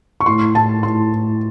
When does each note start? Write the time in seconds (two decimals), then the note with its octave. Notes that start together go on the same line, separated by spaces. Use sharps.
0.20 C#6
0.26 A2 C6
0.55 A2 A5
0.83 A2 C6
1.13 A2